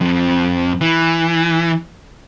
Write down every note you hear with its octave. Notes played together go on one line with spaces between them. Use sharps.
F2
E3